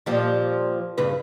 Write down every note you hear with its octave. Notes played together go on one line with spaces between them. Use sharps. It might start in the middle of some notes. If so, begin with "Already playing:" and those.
A#2 F3 G3
G2 C#3 B4